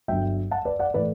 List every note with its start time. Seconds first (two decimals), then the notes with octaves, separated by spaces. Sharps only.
0.08 G1 G2 F#3 E5 G5
0.51 F#5 A5
0.65 B4 D5
0.79 D5 F#5
0.94 A2 E3 B4 D5